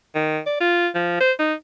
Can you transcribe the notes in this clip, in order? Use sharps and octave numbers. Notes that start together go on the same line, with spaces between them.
D#3
D5
F4
F3
C5
D#4